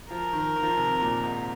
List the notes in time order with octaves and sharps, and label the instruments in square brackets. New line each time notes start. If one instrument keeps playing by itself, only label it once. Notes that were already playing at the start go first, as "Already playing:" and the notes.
[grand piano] F3 [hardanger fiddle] A#4
[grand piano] D#3
D#3
F3
D#3
C3
A#2
G#2